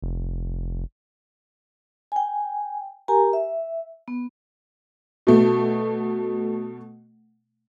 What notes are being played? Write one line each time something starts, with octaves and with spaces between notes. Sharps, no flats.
F1
G5 G#5
G4 A#4 G#5 A#5
E5
B3
B2 A3